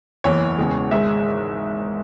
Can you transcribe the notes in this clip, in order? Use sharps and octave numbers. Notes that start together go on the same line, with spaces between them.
F#1 E2 E3 C#5
E1 E2 C#3 G#3
G#1 G#2 G#3 E5